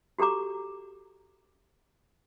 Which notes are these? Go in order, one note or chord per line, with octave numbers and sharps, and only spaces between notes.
F#4 G4 A4 A#5 D6